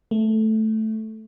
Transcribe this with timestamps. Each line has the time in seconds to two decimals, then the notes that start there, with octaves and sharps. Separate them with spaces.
0.11 A3